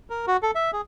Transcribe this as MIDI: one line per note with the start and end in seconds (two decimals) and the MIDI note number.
0.10 0.26 70
0.27 0.37 66
0.43 0.51 69
0.55 0.71 76
0.73 0.81 68